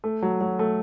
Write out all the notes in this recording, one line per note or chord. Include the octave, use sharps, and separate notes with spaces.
A3
F#3
F#3
A3